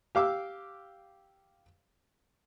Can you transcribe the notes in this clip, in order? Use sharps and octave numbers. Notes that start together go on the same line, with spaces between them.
G4 F5 D6 E6